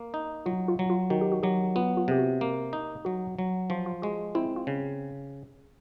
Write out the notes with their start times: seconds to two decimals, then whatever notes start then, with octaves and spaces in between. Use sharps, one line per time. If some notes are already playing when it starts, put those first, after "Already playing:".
Already playing: A#3
0.14 D#4
0.46 F#3 F4
0.68 F4
0.79 F#3
0.90 F4
1.10 D#3 F#4
1.21 G4
1.32 F#4
1.43 F#3 G4
1.76 B3 F4
1.97 F4
2.08 C3 G4
2.18 F#4
2.41 A#3
2.73 D#4
3.05 F#3 F#4
3.39 F#3
3.70 F3 F4
3.86 F4
4.02 G#3 F#4
4.35 C4 E4
4.56 F4
4.67 C#3